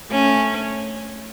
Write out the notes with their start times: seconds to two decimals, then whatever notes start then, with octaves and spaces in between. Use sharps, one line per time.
0.10 A3 C#4